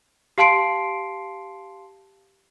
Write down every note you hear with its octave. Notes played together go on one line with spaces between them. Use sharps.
G4 F5 A5 C6 C7 D7